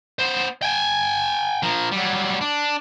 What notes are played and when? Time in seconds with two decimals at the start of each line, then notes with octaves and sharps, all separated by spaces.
0.19 B3 C5
0.62 G5 G#5
1.63 F3 A#4
1.91 F#3 G3
2.41 D4